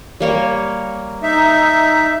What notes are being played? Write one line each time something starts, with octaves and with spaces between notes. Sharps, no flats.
G3 A#3 C#5
D#4 E5